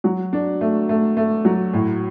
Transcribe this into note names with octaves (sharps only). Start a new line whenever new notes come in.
F#3
D4
A3
A3
A3
F#3
A2